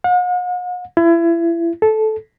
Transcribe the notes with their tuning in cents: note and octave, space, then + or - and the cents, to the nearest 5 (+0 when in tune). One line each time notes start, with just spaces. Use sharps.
F#5 -45
E4 +30
A4 -15